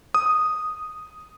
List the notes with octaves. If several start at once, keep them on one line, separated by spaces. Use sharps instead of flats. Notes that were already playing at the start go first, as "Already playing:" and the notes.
D#6